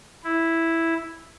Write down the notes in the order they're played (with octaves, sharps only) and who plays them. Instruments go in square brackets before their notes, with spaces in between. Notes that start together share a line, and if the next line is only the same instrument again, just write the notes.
[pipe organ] E4